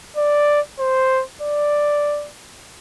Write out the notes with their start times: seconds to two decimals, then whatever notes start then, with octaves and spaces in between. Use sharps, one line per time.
0.17 D5
0.79 C5
1.41 D5